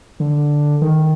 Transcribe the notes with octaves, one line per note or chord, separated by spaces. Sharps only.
D3
D#3